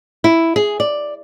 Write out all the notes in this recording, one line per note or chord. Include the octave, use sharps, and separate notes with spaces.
E4
G#4
D5